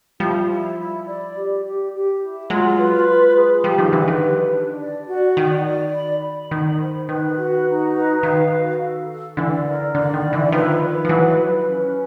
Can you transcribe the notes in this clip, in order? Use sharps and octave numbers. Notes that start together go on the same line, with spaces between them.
F3 G3 E4
E4
E4
D5
G4
G4
G4
E4
F#3 G#3 F4
B4
F4
G#4
F3 G3 G4
D#3 F3
D3 E3 B4
D#3
G4
D4
D5
F#4
D#3 D5
D5
B5
B5
D#3 B5
C5
D#3 B4
F#4
D#4
B4
D#3 F5
F#4
A4
A4
D3 E3 D5
A#4
D3 D5
D#3
E4
D3 E3
D#3 F3 B4
B4
F3
E3 F#3 B5
B4
C#4